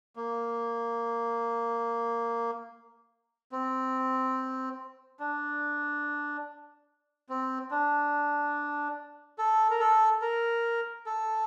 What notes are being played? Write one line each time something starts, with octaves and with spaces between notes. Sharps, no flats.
A#3
C4
D4
C4
D4
A4
A#4
A4
A#4
A4